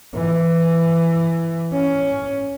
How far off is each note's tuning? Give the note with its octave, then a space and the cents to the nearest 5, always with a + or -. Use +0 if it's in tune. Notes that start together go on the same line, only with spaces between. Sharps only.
E3 +15
C#4 +10